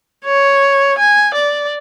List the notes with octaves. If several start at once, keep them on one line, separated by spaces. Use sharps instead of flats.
C#5
G#5
D5